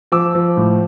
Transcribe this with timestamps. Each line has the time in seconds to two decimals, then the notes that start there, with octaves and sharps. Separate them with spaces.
0.12 F3 D6 E6
0.35 F3
0.57 A2